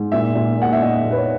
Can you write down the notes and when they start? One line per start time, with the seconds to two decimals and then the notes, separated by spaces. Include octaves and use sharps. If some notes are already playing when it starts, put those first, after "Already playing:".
Already playing: G#2
0.12 A#2 E5
0.35 A#2
0.58 A#3 F#5
0.72 E5
0.82 A#2 D#5
1.05 A#2
1.11 B4
1.17 C#5